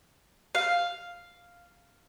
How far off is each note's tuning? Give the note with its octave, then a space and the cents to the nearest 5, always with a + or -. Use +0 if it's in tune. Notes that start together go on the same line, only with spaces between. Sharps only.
F5 +0